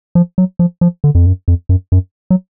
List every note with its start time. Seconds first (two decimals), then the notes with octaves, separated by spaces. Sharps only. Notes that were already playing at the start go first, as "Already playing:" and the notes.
0.15 F3
0.38 F#3
0.59 F3
0.81 F3
1.04 D3
1.15 F2
1.26 F#2
1.48 F2
1.69 F#2
1.92 F#2
2.30 F#3